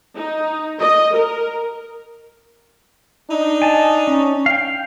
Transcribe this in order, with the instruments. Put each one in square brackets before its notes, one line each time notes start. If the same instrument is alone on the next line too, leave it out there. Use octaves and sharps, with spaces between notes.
[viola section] D#4
D#5
A#4
[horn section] D4 D#4
[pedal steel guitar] G#5 A5
C#4
F5 G5